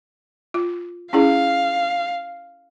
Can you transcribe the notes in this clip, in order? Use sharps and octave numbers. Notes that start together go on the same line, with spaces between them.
F4
C#4 E4 G#4 F5